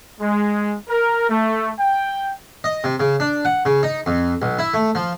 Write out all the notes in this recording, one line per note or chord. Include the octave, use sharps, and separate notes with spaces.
G#3
A#4
A3
G5
D#5
C3
C#3
D4
F#5
C#3
D#4
F2
B1
E4
A3
F3